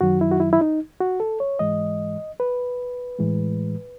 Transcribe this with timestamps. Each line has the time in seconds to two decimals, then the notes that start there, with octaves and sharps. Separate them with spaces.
0.01 F#2 D#3 F#3 F#4
0.21 E4
0.31 F#4
0.40 E4
0.53 E4
0.61 D#4
1.01 F#4
1.20 A4
1.40 C#5
1.59 G#2 E3 G#3 D#5
2.40 B4
3.19 A2 E3 G#3